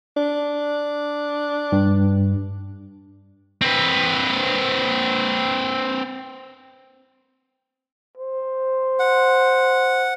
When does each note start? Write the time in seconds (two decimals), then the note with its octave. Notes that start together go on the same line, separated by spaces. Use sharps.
0.17 D4
1.72 G2
3.61 C4 B4
8.17 C5
8.99 F#5